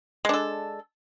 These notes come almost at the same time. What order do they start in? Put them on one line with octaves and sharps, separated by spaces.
G#3 D4 A4